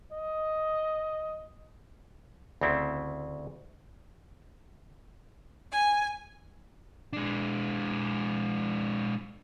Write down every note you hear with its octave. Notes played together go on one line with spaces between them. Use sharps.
D#5
D2 C#3 C4 E4
G#5
G#3 D4